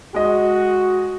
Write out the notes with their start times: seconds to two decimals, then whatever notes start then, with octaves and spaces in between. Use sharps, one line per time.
0.14 G#3 F#4 D#5